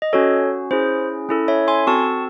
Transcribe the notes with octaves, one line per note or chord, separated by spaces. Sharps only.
D#5
C#4 F#4 A4 C#5
C#4 E4 G#4 C5
C#4 E4 A4
C#5 E5
G#5 C6
C4 F#4 A4 A5 C#6